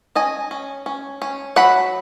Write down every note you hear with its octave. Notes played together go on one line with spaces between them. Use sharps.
C#4 D#5 G#5
C#4
C#4
C#4
F#3 F#5 B5